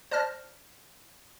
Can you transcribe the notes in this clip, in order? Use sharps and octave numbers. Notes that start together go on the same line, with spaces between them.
C5 D5 A5 F6 A#6